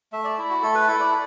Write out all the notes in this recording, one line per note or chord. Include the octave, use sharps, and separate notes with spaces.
A3 E5
D5
E4
F#4
A3 A4
B4
E4 A4
D5